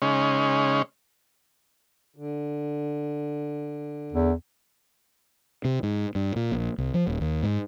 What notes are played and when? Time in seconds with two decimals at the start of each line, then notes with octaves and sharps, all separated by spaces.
0.02 C#3 G#3 C#4 D#4
2.16 D3
4.12 E2
5.65 C3
5.83 G#2
6.15 G2
6.36 A#2
6.52 A#1
6.78 C2
6.94 F3
7.07 D#1
7.21 D#2
7.43 G#2